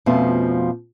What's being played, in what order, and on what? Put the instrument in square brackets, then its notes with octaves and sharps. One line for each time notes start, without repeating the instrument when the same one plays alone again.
[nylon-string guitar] F2 B2 F3 A3 B3 C#4